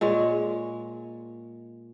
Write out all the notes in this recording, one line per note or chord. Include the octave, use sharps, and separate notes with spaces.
A#2 G#3 C#5